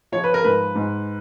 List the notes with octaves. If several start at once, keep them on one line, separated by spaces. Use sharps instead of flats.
F3 C#5
B4
A#4
G#2 B4
G#2